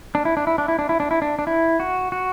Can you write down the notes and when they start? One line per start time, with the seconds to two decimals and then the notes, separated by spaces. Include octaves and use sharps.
0.15 D4
0.25 E4
0.37 D4
0.47 E4
0.58 D4
0.68 E4
0.79 D4
0.89 E4
1.00 D4
1.11 E4
1.22 D4
1.39 D4
1.47 E4
1.80 F#4
2.12 F#4